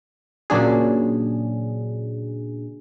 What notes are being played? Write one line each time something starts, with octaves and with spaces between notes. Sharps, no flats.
A#2 C#3 F#3 D4 G#4